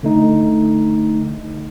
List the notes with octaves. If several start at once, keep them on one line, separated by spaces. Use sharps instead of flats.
D3 A3 D#4